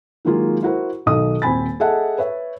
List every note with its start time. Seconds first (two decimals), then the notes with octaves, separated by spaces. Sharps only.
0.25 D#3 F#3 G#3 A#3 F4 G#4
0.63 E4 F#4 A#4 C5
1.06 B1 D#3 A4 D#5 D#6
1.42 D#1 C4 G#5 B5 A6
1.80 G#4 A4 D#5 E5 F#5 A5
2.18 B4 C#5 E5